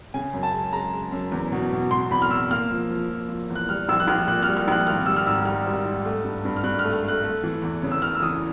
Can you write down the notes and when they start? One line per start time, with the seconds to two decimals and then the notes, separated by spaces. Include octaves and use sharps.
0.14 C#3 G#5
0.33 F#2
0.43 A5
0.53 G#3
0.73 G#3 A#5
0.93 G#3
1.12 F#2
1.32 E2
1.52 B2
1.72 B2
1.91 B2 C6
2.11 E2 B5
2.22 F6
2.30 E2 E6
2.51 A#3 F6
2.71 F3
2.90 F3
3.10 F3
3.29 F3
3.49 E2
3.55 F#6
3.69 G3 F6
3.89 A#1 E6
4.00 F#6
4.07 A#1 F6
4.27 A#2 F#6
4.43 G3 F6
4.57 F6
4.68 A#1 F#6
4.87 G#1 F6
5.06 G3 E6
5.16 F6
5.27 G#2 E6
5.45 G3 F6
5.66 G3
5.86 G#2
6.05 A3
6.24 G2
6.45 G2
6.56 F6
6.64 G2 F#6
6.79 F6
6.84 A3
6.93 F6
7.04 A3 F#6
7.23 A3
7.43 E3
7.62 E2
7.83 C#3
7.92 E6
8.01 C#3 F6
8.15 E6
8.22 E3 D#6